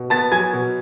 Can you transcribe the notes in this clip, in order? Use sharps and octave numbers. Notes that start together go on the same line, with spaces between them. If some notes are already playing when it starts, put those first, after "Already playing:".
Already playing: B2
B3 A5 A6
F#3 G#5 G#6
B2